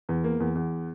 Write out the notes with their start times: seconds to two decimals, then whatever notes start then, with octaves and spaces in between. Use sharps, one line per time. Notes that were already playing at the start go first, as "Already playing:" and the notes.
0.09 E2
0.24 A#3
0.40 E2
0.55 E2